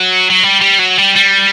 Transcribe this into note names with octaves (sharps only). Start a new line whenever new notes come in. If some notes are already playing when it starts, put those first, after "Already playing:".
Already playing: F#3
F#3
G3
G3
F#3
G3
G3